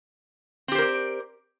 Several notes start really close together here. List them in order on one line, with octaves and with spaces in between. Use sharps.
C4 G4 C5 A#4 D5